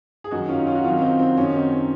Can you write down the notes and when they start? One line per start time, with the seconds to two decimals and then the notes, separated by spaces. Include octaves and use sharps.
0.24 G#4
0.31 F#2 D#3 F#3 D#4 F#4
0.49 C#4 F4
0.59 D#4
0.67 C#4 F4
0.75 F#4
0.84 C3 D#3 F#3 C#4 F4
1.01 C4 D#4
1.19 C4
1.37 F#2 D#3 F#3 C#4
1.55 C4 D#4
1.72 C#4